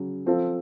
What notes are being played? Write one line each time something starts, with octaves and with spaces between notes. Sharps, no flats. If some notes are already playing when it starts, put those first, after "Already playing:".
Already playing: C#3 F#3
F3 C4 F4 A4